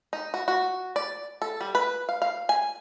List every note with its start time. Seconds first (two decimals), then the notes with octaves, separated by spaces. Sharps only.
0.13 D#4
0.34 F#4
0.48 F#4
0.96 D5
1.42 A4
1.61 G3
1.75 B4
2.09 F5
2.22 F5
2.49 G#5